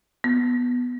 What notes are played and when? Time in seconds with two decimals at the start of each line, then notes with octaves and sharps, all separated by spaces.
0.24 B3